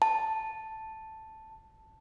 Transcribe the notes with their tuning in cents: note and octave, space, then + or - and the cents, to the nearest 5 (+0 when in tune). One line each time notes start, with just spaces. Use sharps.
A5 +0